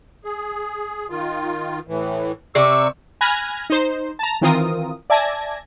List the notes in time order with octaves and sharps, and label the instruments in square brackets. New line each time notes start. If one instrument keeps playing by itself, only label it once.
[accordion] G#4
D#3 F4
A2 E3
[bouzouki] C3 D5 [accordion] C#6 E6
[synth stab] G#5 B5 F6 F#6 G#6 A#6
D#4 C5
A5 A#5
D#3 E3 C4 F4 A#4 D#6
D5 E5 G#5 A5 G#6 A#6